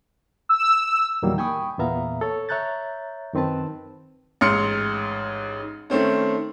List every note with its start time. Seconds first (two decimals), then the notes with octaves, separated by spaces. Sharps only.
0.49 E6
1.22 E2 A#2 D#3 F#3 G3 A#3
1.38 G5 G#5 B5 C#6 D#6
1.79 E2 A#2 B3 E5 F5 A#5
2.21 A4 C#5
2.49 C#5 E5 A#5 F#6 G6 A6
3.33 F#2 D#3 C4 B4 A5
4.41 A1 G#2 C6 F6 C#7
5.90 D#3 A3 C4 C#4